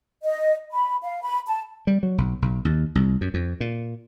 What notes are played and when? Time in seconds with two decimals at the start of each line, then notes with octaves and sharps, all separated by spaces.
0.24 D#5
0.73 B5
1.03 F5
1.23 B5
1.47 A5
1.87 G3
2.03 F#3
2.18 B1
2.42 B1
2.65 D#2
2.95 C2
3.21 F#2
3.34 F2
3.60 A#2